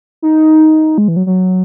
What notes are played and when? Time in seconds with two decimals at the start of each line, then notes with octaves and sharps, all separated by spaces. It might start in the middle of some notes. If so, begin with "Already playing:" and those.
0.22 D#4
0.98 G#3
1.08 E3
1.16 F#3
1.26 F#3